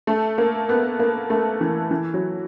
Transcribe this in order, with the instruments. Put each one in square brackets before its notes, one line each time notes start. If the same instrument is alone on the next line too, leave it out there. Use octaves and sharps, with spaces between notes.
[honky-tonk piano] A3
A#3
B3
A#3
A3
E3
E3
F#3